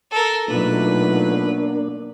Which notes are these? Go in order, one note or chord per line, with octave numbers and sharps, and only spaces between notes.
A4 A#4
B2 F#3 A3 A#3 D4 D#4 F4 B4